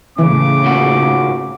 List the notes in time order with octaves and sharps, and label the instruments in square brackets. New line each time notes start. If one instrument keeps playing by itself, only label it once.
[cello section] A2 C#3 [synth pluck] E3 [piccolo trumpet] D6
[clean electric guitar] D#2 A#2 F#4